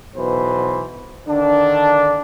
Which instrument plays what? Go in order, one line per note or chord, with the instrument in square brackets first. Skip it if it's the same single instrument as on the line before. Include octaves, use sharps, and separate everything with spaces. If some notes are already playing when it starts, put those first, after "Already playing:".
[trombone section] B1 B2 E3 B4 C5
D3 D#3 D4